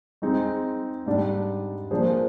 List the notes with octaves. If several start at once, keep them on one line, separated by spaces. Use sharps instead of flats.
G#3 C4 D#4 G#4
G#2 G3 D4
F3 A#3 D4 G#4 C5